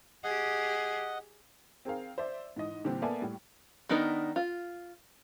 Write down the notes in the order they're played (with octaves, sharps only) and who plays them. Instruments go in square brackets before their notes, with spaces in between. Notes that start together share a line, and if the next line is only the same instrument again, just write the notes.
[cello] G4 G#4 [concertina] D#5 F#5
[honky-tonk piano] C4 G#4 A#4 F5
C5 D5 E5
G#2 E3 D#5
A#2 D3 E3 G3 C4
A#3 B3 A4 D5 E5 G#5
A2 G3
[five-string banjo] D#3 B3 D4 D#4 A#4
F4